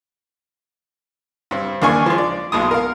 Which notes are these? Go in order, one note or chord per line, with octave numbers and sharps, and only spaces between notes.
G2 C4
D#2 A#3 D4 F5 G#5 C#6
F3 G#3
D5
B1 B2 G#3 D#6
A#4 F5